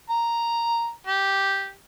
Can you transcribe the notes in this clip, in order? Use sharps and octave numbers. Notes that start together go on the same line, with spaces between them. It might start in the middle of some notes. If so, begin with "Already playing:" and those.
A#5
G4